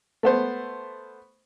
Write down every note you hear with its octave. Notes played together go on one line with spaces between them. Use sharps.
A3 B3 C5